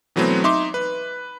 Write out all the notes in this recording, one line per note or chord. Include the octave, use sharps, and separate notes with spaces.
B2 E3 F#3 A3 B3 C4
D#4 E5 C6 D6
B4